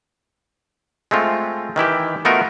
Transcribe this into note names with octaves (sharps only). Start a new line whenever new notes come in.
G#3 A3 C4 F4
D#3 E3 E4 G4
A3 B3 D#4 F4 F#4 A#4